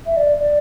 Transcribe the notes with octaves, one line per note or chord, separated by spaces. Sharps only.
E5
D5
D5